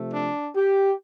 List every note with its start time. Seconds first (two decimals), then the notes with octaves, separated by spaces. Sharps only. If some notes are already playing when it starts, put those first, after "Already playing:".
Already playing: C3 F3 A3
0.14 D4
0.54 G4